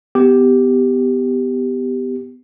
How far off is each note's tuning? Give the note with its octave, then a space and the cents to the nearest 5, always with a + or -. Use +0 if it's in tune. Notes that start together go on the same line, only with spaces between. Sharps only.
B3 +20 G4 +0